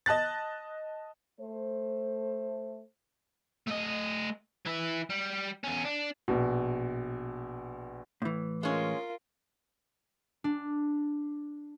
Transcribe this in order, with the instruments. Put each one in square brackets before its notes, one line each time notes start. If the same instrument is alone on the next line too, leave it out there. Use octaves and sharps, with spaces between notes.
[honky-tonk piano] D#5 A5 F#6 A6
[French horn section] A3 C5
[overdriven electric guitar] A3 D#5
E3 E4
G3
E2 C#4
D4
[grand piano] A#1 B2
[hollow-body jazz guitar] A2 E3
[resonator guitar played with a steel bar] G#3 C#4 [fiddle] F4 A#4
[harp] D4